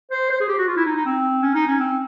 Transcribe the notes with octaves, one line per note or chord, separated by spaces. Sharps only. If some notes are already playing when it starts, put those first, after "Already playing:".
C5
C5
G#4
G4
F#4
F4
E4
D#4
D#4
C4
C#4
D#4
C#4
C4